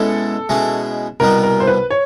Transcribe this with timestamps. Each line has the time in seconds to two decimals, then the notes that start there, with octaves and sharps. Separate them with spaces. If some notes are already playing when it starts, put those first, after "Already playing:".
Already playing: B2 G#3 C#4 E4 A4
0.49 B2 G#3 C#4 E4
1.20 C2 B2 G3 B3 A#4
1.43 A#4
1.60 C5
1.67 B4
1.90 C#5